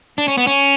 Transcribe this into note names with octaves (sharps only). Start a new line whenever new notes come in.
D4
C#4
B3
C#4